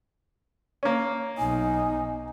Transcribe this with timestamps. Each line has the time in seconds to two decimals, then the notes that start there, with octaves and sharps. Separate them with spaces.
0.83 A#3 C#4
1.38 B1 D#4 G#5